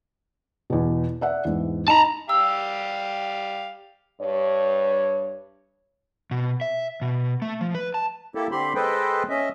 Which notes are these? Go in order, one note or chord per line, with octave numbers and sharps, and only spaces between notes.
E2 B2
D5 E5 F#5
E2 G#2
D#4 A5 A#5
G3 G4 F5 E6
G2 C#5
B2
E5
B2
A3
F3
B4
A5
A#3 E4 G4 A4
D3 C4 G4 B5 C6
G#3 A4 B4 C5 D#5 G5
C#4 D#5 E5